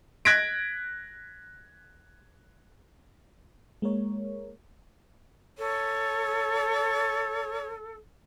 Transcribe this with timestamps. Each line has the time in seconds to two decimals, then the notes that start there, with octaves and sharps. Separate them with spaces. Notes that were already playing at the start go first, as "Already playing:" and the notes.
0.25 F#6 G#6 A#6 B6 D7
3.82 G#3 A#3 A#4 C#5
5.58 A4 C#5